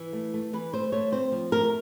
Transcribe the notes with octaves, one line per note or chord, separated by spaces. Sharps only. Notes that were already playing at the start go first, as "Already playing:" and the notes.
Already playing: E3
A3
A3
E3 B4
A3 C5
A3 C#5
C4 C5
F3
A3 A#4